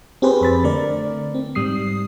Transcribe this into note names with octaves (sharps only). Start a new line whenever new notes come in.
C4 G4 G#4 B4 C5
F2 B5 A6
D3 A3 A#4 D5
C4
G#2 G3 D#6 C7